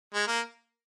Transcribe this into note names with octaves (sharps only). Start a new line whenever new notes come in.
G#3
A#3